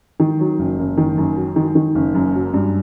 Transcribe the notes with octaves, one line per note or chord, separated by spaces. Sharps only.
D#3
F#3
F#1
F#1
D#3
F#2
F#3
D#3
D#3
F#1
F#2
F#3
G2